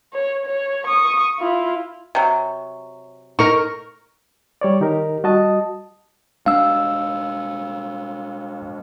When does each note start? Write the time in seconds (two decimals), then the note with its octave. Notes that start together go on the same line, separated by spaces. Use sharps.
0.13 C#5
0.45 C#5
0.87 C#6 D#6
1.40 E4 F4
2.15 C3 F#3
3.39 D#4 A#4 C#6
4.61 G3 C#5 D5
4.81 D#3 D#4 G4 A#4
5.24 G3 F#4 D#5 A5 D#6
6.46 G#3 D4 F5 E6